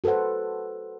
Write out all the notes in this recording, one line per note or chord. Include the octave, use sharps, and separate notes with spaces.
F#4 A4 B4 C5 F#5